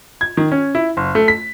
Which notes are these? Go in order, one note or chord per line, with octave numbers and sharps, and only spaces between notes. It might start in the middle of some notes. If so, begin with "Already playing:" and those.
G#6
D#3
C#4
E4
F#1
A3
B6